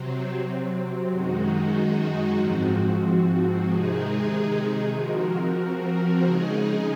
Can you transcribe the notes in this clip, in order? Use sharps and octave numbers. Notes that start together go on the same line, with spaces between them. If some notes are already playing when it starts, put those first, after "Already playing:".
Already playing: C3 F#3 C4
F#2 D#3 G#3 D#4 F#4
G#2 F3 C4 F#4
C3 D#3 G#3 D#4 G#4
F3 C4 F#4 A#4
C#3 G#3 D#4 G#4